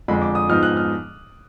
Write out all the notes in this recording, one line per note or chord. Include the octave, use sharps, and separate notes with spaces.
F2 D3 G#3 B5
D6
D#6
G#2 F3 G#3 B3 D#4 F6
F#6
F6